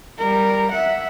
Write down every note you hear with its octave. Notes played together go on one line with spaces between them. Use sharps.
G3 A#4
E5 F#5